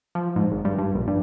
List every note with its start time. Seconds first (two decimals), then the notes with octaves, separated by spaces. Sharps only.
0.15 F3
0.36 G#2
0.51 G#1
0.65 G2
0.78 G2
0.94 A#1
1.08 G2